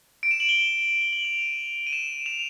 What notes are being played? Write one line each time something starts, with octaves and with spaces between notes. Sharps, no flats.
D7
E7
F#7
G7
G7
F#7
F7
D#7
D#7
E7
F7